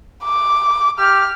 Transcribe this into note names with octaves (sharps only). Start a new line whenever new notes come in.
D6
G4 F6